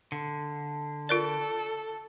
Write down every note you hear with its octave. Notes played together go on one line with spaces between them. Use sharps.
D3
F4 A4 A#4 D5